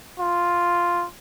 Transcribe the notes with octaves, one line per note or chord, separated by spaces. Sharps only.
F4